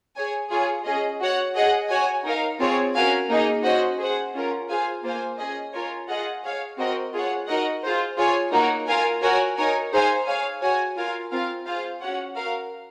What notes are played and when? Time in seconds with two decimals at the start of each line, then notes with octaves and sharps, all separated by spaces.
0.16 G#4 C#5 G#5
0.50 F4 G#4 C#5 G#5
0.85 C#4 G#4 D#5
1.20 F#4 C#5 F#5
1.55 G#4 D#5 F#5
1.90 F#4 C#5 G#5
2.25 D#4 A#4 F5
2.59 C4 F4 G#4 C#5
2.95 C#4 F#4 A#4 F5 G#5
3.29 A#3 D#4 G#4 D#5
3.64 C#4 F#4 C5 D#5
3.99 G#4 C5 F#5
4.34 C#4 F4 A#4
4.69 F4 G#4 C5 F5 G#5
5.03 A#3 F4 C5 F5 G#5
5.38 C#4 G#4 D#5 G#5
5.73 F4 A#4 C#5 G#5
6.08 F4 G#4 D#5 F#5
6.43 G#4 C#5 F5
6.78 C4 F#4 A#4 D#5
7.13 F4 G#4 C#5 F#5
7.48 D#4 F#4 A#4 D#5 F#5
7.83 F4 G#4 C5
8.17 F4 G#4 C#5 G#5
8.52 A#3 D#4 F#4 A#4 C#5
8.87 F4 A#4 F5 G#5
9.22 F#4 A#4 C#5 G#5
9.57 D#4 A#4 C#5 G#5
9.92 D#4 G#4 C5 F5 G#5
10.26 G#4 C#5 F5 G#5
10.62 F#4 C#5 G#5
10.96 F4 A#4 F5 G#5
11.31 C4 F4 A#4 F5
11.66 F4 G#4 C5 F5
12.01 C#4 F#4 C#5 F#5
12.35 F#4 A#4 F5